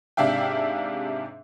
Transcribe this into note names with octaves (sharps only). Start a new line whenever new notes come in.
G#2 C3 D4 E5 F5 G5